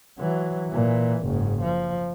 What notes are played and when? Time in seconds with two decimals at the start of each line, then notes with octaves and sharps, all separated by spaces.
0.19 E3 F#3
0.69 A#2 E3
1.25 F#1 G#2
1.62 F3